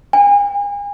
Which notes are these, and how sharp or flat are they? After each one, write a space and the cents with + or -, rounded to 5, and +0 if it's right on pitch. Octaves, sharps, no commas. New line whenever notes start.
G#5 -35